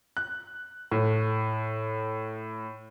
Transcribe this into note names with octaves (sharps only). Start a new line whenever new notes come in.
F#6
A2